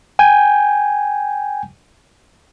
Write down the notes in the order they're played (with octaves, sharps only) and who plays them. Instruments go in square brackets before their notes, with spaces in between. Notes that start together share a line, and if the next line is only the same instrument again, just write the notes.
[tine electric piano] G5 G#5 G6